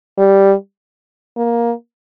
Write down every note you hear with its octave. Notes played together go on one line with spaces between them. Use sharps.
G3
A#3